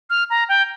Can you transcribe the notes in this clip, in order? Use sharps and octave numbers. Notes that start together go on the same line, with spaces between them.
F6
A#5
G5